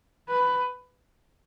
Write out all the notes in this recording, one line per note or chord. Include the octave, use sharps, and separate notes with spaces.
B4